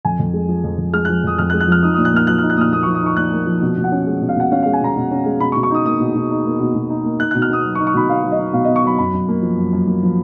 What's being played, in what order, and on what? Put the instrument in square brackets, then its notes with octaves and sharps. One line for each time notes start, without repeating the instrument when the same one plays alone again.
[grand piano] F2 G#5
F2
G#3
F3
F2
F2
G#3 F6
F#6
F3
F2 D#6
F2 F6
F#6
G#3
F#6
F3 F6
D#4 D#6
D#6
A#2
F#6
A#3 F6
F3 F#6
F6
D#4
F#6
A#2 D#6 F6
A#3 D#6
C#6
F3
D#6
D#4 C#6
A#2 F#6
A#3
F3
B2
B2
F#5
C#4
G#3
B2
F5
B2 F#5
C#4 F5
F5
G#3
G#5
B2 A#5
B2
C#4
G#3
B2 B5
C#6
B2
C#6
D#4 D#6
A#3 D#6
B2
B2
D#4
A#3
B2
B2
D#4
A#3
D#4 F#6
F#6
B2
F6
B3 D#6
F#3
C#6
D#4
C#6
B2 B5
B3 F5
F#3
D#5
D#4
B2 F5
D#5
B3
C#6
F#3 B5
F#2 B5
F#2
A#3
F3
F#2
F#2
A#3
F3